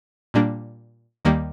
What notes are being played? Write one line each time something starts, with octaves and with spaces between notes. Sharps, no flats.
A#2 G3 A#3 D4
D#2 D#3 G3 A#3